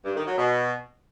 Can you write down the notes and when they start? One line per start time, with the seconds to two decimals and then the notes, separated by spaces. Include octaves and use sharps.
0.05 G2
0.16 D#3
0.27 F#3
0.37 B2